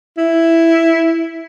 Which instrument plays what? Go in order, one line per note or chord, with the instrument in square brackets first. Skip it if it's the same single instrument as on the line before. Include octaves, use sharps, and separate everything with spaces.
[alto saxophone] E4